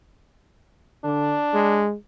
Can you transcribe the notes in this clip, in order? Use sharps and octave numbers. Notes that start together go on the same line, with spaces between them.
D3 D4
G#3